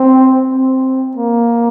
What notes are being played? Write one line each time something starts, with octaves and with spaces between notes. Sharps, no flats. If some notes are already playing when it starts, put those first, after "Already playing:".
Already playing: C4
C4
A#3